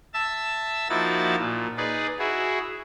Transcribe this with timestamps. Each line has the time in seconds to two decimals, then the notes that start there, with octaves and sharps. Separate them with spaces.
0.14 E5 A5 E6
0.89 F3 A#3 D#4 E4 F#4 A6
1.39 A#2
1.77 D#4 G#4 B4 D5
2.19 E4 F#4 G#4